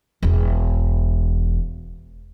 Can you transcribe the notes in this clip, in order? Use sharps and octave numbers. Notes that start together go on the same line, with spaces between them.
E1 E2